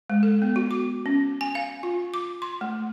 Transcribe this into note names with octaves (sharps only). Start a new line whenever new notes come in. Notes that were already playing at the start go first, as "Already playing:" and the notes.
G#3
A4
B3
F#4
D6
C#4
G#5
F5
F4
D6
C6
A3